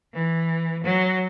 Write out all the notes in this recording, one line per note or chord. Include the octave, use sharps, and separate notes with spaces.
E3
F#3